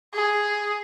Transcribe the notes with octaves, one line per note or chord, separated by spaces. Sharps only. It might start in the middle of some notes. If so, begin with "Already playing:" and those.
G#4